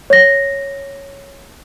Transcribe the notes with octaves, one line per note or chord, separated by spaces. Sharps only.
C#5 A#6